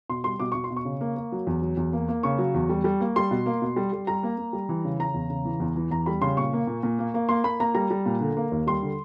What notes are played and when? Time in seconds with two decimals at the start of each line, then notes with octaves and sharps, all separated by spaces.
0.09 B2 C6
0.24 G3 C6
0.40 B2 D6
0.52 B2 C#6
0.64 C6
0.70 B2
0.76 C#6
0.85 C#3
1.01 A#3
1.16 A#3
1.32 F#3
1.47 E2
1.62 F#3
1.77 E2
1.93 A#3
2.08 A#3
2.23 C#3 C#6
2.38 F#3
2.55 E2
2.69 G3
2.84 G3
3.01 A#3
3.16 G3 C6
3.31 B2
3.46 A#3
3.62 B2
3.76 G3
3.93 G3
4.07 G3 A#5
4.23 A#3
4.37 A#3
4.53 G3
4.69 E3
4.85 C#3
4.99 C#3 A#5
5.14 E2
5.30 C#3
5.45 E3
5.60 E2
5.76 E3
5.91 E2 A#5
6.06 G3 B5
6.22 C#3 C6
6.37 A#2 C#6
6.53 A#3
6.67 A#2
6.83 A#2
6.99 A#3
7.14 A#3
7.29 A#3 C6
7.44 A#3 B5
7.60 A#3 A#5
7.75 G3 A#5
7.91 G3
8.06 A#2
8.21 D3
8.37 A#3
8.52 D#2
8.67 G3 C6
8.83 D3